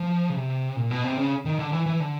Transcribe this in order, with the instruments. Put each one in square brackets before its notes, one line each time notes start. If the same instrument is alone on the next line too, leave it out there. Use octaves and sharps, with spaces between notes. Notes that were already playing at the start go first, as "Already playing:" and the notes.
Already playing: [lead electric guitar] F3
C#3
C3
A#2
B2
C3
C#3
D#3
D3
E3
E3
D3